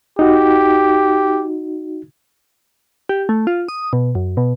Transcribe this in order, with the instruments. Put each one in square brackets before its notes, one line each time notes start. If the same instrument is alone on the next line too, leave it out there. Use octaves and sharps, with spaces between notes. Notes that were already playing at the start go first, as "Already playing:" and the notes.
[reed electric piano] D#4 F#4 [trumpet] G4
[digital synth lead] G4
A3
F4
D#6
B2
F#2
B2